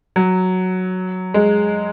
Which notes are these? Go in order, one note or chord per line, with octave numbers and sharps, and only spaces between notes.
F#3
G#3